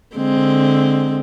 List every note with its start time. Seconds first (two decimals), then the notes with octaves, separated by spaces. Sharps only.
0.15 D3 G#3 C4